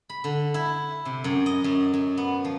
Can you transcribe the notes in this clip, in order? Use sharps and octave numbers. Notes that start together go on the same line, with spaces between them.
B5
D3
E4
C3
F#2
D#5
F#2
F#2
B3
F3